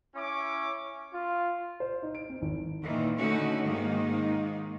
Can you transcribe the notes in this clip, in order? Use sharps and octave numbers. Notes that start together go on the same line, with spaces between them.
C#4 E4 C#5 G#5 D6
F4
C5
D#4
D7
C4
G#1
E3
A#2 D#3 E3
D3 A3 C#4 D#4 F#4
G#2 D#3 A#3 D#4